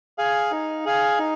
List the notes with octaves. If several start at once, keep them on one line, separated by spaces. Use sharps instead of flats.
G#4 F5 G#5
D#4
G#4 F5 G#5
D#4